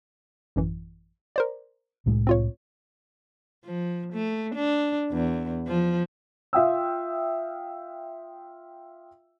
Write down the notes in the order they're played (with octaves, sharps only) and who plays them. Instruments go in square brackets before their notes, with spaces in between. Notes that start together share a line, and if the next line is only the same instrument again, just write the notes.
[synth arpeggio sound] A1 F#2 E3
A#4 C5 D5
[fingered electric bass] C2 A2 G#3
[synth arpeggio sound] C4 F4 C#5
[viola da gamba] F3
A3
D4
E2
F3
[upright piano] F4 E5 F5 G5 D#6 E6